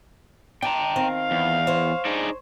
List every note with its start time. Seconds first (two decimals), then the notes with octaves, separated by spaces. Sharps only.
0.62 D4 G5 G#5 A#5
0.96 D#3 C4 F5
1.31 E2
1.67 C5 C#5
2.05 D4 D#4 G#4